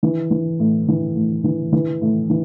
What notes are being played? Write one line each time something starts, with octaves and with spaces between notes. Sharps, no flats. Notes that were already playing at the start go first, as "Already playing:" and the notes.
E3
E3
A2
E3
A2
E3
E3
A2
E3